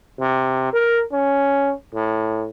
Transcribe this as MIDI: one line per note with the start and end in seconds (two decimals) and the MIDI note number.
0.19 0.71 48
0.72 1.01 70
1.12 1.73 61
1.94 2.50 45